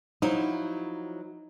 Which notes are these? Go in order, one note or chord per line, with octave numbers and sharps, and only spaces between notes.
F3 F#3 D#4 E4